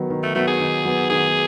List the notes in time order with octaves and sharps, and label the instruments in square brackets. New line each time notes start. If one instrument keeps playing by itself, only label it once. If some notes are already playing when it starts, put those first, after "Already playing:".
Already playing: [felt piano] D#3 F#3 B3
D#3
[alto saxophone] A3
[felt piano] F#3 B3 [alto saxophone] A3
[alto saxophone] G#4
[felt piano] D#3
F#3 B3
[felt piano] D#3 [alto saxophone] G#4